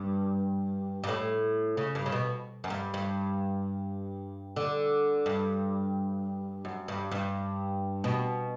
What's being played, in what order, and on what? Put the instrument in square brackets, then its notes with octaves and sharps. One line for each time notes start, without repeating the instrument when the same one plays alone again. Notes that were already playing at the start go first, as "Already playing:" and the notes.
Already playing: [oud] G2
G2
A2
C#3
G2
C#3
B2
F#2
G2
G2
D3
G2
F#2
G2
G2
B2